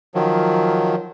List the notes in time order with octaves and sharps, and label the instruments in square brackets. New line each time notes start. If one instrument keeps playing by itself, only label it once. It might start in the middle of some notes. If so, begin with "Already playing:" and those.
[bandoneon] D#3 F3 F#3